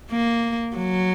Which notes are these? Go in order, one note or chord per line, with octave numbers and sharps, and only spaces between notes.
A#3
F#3